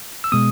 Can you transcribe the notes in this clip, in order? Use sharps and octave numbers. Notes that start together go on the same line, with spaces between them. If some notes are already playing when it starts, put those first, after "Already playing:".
E6
B2 G#3 B3 D#6